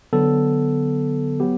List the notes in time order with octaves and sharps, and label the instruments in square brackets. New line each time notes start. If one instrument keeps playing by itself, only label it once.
[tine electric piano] D3 F#3 B3 A4
F#3 B3 G4